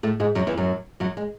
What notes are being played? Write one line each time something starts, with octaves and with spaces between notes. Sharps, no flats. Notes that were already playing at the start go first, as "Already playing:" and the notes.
A2 A3
G#2 G#3
F#2 F#3
E2 E3
F#2 F#3
F#2 F#3
G#3